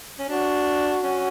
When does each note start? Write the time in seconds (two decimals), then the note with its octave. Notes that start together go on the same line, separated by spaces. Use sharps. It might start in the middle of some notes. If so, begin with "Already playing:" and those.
0.19 C#4
0.29 D4 F#4
1.03 C#4